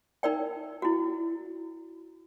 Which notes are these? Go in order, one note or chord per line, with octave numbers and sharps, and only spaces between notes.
D#4 A#4 D5 G5
E4 F#4